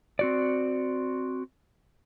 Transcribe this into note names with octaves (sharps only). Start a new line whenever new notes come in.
C4 F#4 D5